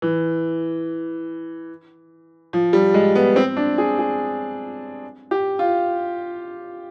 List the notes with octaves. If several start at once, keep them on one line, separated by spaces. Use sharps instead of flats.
E3
F3
G3
G#3
B3
C4
D4
G#4
G#4
G4
F4